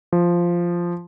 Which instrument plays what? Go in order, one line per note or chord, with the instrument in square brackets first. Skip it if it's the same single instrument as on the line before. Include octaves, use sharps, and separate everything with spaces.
[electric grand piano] F3